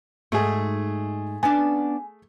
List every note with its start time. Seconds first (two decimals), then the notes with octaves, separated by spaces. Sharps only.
0.32 G#2 A3 F#4 G#4
1.43 B3 C#4 D4 G#5